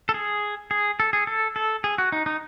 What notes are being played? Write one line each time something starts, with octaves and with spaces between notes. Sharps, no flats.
A4
G#4
G#4
A4
G#4
A4
A4
G#4
F#4
D#4
D#4